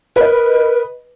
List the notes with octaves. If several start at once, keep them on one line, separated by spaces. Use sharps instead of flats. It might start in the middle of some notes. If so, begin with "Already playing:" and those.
A#4 B4 D#5